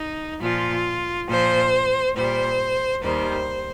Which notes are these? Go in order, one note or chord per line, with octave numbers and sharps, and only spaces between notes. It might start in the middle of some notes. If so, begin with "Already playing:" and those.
Already playing: D#4
A#2 F3 F4
A#2 F3 C5
A#2 G3 C5
D#2 D#3 G3 C5